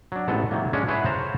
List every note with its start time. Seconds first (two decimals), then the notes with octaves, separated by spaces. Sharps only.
0.12 F#3 D4
0.28 A1 G#2 B3 A4
0.51 D#3 E3 F#3 A#3
0.73 G#3 C#4 D4
0.88 E4 G#4 A4 B4 C#5 F#5
1.05 C5 C#5 F5 F#5 A5 A#5